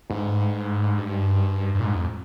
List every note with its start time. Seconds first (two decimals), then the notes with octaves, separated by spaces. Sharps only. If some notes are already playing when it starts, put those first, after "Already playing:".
0.10 G#2
0.98 G2
1.75 G2
1.80 A#2
1.85 G#2
1.94 F2